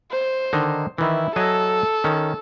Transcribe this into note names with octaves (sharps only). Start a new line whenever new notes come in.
C5
D3 D#3 D#4
D#3 E3 E4
F#3 A4 D#5 G#5
D#3 C#4